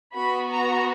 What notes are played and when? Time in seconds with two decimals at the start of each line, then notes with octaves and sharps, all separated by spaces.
0.14 B3 F#4 B5
0.50 A#5